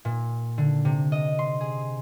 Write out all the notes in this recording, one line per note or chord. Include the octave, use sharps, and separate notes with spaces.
A#2
D3
C3
D#5
C6
G#4